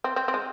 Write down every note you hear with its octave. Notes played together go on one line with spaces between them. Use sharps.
C4
C4
C4
G#3